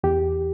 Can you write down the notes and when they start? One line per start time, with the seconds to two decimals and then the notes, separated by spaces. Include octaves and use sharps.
0.04 E2 G4